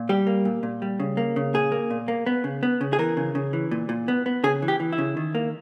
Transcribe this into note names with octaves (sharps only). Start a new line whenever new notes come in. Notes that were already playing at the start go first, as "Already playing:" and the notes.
Already playing: A#2
G3 G4
A#3
A#2
A#2
G3
C#3
A#3
C#3
A#2 G#4
A#3
A#2
A#3
B3
C#3
B3
C#3
G#4
E3 A#4
C#3
C#3
E3
A#2
A#2
B3
B3
C#3 G#4
E3
G4
E3
E4
C#3
D#3
A#3